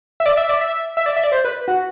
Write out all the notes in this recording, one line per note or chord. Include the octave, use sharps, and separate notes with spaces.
E5
D5
E5
D5
E5
E5
D5
E5
D5
C5
B4
F#4